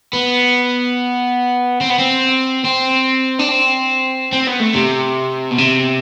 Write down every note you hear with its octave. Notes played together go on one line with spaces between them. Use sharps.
B3
C4
B3
C4
C4
D4
C4
C4
B3
A3
C3
B2
C3